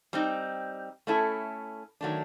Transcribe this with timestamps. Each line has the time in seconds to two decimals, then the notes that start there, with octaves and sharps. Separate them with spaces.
0.13 G3 C4 D#4
1.07 A3 C#4 E4 A4
2.01 D#3 F#3 A3 D4